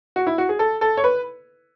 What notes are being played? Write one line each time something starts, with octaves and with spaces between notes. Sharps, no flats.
F#4
E4
F#4
G#4
A4
A4
C#5
B4